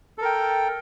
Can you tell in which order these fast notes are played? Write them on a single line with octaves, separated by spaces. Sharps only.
A4 A#4 G5